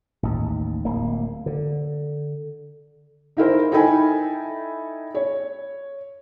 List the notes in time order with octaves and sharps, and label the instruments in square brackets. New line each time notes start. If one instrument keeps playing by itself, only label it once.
[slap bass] A1 D#2
D1 A#3
D3
[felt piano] D#4 E4 A#4 C5
D#4 E4 A4 G5 G#5 B5
C#5